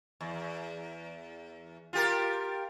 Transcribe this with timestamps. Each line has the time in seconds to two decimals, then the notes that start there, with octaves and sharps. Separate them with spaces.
0.21 E2
1.93 F4 G4 A#4